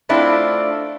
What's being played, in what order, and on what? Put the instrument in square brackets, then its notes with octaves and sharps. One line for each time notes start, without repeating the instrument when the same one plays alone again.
[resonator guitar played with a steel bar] A3 C4 D4 E4 F4